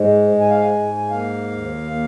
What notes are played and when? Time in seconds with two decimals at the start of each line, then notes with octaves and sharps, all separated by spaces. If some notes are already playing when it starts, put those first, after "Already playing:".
Already playing: G#2 G#3
0.31 G#2
0.41 G#5
0.50 F5
0.60 G#5
0.71 G#2
0.97 G#5
1.10 A#3 F5
1.51 D#2
1.91 A#3